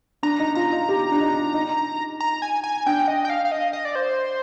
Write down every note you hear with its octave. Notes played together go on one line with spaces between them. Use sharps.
D4 A#5
D#4
F4 A#5
D#4
G4
D4
D#4
D#4
A#5
G#5
G#5
D4 G5
D#5
G5
F5
F5
D#5
D#5
D5
C5